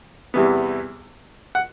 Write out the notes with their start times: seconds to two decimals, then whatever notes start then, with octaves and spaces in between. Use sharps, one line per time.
0.34 E2 C3 E3 G3 B3
1.55 F#5